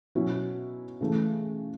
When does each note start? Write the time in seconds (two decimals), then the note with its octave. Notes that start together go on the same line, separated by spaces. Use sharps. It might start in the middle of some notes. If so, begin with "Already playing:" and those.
0.15 B2 F#3 C#4 E4
1.01 C#3 E3 A3